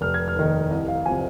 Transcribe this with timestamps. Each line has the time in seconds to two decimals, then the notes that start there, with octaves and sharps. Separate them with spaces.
0.01 F1 F6
0.14 G#6
0.28 F6
0.36 D#2 D#3
0.70 C2 D#5
0.88 F5
1.06 C3 F3 G#5